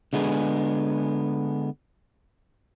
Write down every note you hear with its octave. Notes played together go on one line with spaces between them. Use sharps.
D3 G#3 B3 G#4